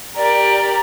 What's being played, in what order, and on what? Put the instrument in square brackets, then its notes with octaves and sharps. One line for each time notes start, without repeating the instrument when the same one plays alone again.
[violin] G4 A#4 [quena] D5